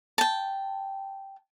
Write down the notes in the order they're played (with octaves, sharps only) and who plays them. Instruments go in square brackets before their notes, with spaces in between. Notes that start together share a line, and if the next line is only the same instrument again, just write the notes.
[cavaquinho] G5 A5